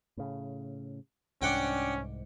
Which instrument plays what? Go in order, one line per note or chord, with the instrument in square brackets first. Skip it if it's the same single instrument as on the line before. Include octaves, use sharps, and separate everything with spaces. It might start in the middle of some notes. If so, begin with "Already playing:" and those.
[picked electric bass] A2 C#3
[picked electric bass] C2 G#2 [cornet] C#4 [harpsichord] D4 F#5 G5